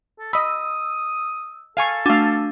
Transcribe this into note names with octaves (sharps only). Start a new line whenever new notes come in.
A4
D#5 B5 D#6 E6
A4 F5 G#5 C#6
A3 D4 F#4 F5